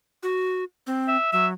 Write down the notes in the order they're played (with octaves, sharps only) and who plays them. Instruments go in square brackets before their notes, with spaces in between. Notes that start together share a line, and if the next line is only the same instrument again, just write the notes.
[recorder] F#4
C4
[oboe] E5
[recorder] F#3 [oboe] E5